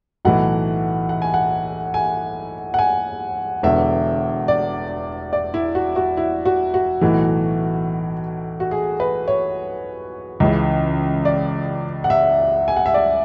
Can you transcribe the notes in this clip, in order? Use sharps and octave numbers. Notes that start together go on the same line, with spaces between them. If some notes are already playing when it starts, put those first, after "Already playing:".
B1 A2 E3 F#5
F#5
G#5
F#5
G#5
F#5
G#5
E1 E2 D3 E5
D5
D5
E4
F#4
F#4
E4
F#4
F#4
B1 A2 E3
F#4
G#4
B4
C#5
C#2 C#3 E3
D5
F#5
E5
G#5
F#5
E5
D5